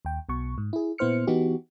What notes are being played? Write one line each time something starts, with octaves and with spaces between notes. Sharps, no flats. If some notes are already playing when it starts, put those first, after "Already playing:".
D#2 G5
B1 B2 C#6
G#2
E4 G#4
A#2 B3 E4 C5 F6 C#7
E3 B3 D#4 F#4 G4